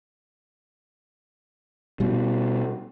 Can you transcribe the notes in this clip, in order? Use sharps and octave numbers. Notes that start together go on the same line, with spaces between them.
B2 G3